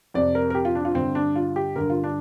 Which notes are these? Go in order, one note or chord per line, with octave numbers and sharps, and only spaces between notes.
F2 C3 D5
A#4
A#4
G4
F4
D4
F4
G2 D3 C4
D4
F4
G4
G2 D3 A#4
F4
D4